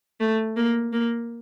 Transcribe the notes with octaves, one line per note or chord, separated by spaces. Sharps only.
A3
A#3
A#3